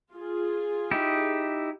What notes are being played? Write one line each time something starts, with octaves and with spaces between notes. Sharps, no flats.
F4 G#4
D#4 E4 G4